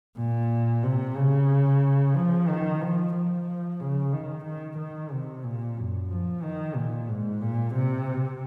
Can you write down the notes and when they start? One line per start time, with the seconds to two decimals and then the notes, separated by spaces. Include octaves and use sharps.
0.18 A#2
0.83 C3
1.16 C#3
2.15 F3
2.47 D#3
2.81 F3
3.14 F3
3.80 C#3
4.13 D#3
4.45 D#3
4.78 D#3
5.12 C3
5.44 A#2
5.76 F#2
6.11 F3
6.43 D#3
6.76 A#2
7.09 G#2
7.41 A#2
7.75 C3